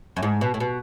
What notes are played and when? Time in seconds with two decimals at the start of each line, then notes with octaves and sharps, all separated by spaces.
0.17 F#2
0.23 G#2
0.41 B2
0.54 A2
0.60 B2